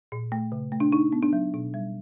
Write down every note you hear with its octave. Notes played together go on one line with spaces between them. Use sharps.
A#2
A3
C#3
A3
D4
D4 D#4
B3
D4
F#3
B2
G3